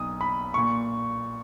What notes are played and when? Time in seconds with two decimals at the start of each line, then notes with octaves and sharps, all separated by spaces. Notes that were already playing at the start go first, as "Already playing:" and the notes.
Already playing: B1 D#6
0.21 B5
0.54 A#2 C#6